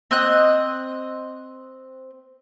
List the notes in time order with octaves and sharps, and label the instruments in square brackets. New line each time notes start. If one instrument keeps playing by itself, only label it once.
[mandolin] C4 D#5 F#6